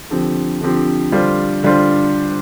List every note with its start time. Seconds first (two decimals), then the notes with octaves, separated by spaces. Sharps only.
0.10 D3 F3 C4 G4
0.61 D3 F3 C4 G4
1.12 D3 G3 D4 F4 C5
1.63 D3 G3 D4 F4 C5